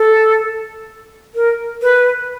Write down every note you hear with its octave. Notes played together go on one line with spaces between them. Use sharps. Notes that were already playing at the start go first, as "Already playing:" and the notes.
Already playing: A4
A#4
B4